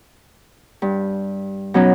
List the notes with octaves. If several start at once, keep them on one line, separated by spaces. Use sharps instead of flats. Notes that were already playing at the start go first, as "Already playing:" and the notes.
G2
B2 F#3 C#4 D#4